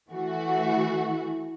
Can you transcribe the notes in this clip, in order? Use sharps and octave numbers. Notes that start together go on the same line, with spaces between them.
E3 A3 F#4